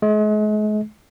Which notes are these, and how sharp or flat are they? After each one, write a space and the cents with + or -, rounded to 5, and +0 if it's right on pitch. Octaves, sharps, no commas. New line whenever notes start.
G#3 +40